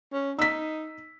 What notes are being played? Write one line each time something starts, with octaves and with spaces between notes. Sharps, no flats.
C#4
D#4 E6 B6